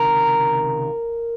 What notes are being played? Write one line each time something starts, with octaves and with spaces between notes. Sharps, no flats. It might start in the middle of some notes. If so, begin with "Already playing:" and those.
Already playing: C#2 C3 D#3 A#4